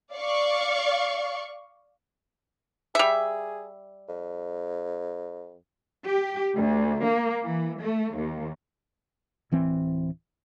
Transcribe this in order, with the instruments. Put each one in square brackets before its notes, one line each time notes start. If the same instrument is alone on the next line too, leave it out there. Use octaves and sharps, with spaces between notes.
[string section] D5 F5 C#6
[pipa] G3 E5 [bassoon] G#4
[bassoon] F2
[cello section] G4
D2
A#3
E3
A3
D#2
[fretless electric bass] D1 E3 C4